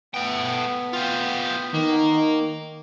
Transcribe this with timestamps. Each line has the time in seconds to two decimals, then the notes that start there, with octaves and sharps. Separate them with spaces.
0.14 A3 B3 G5
0.93 F4 G4
1.74 D#3 A#3